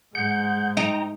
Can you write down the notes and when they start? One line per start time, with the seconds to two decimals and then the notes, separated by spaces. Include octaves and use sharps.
0.15 G#2 G#3 F#5 G6
0.77 D#4 G5 A#5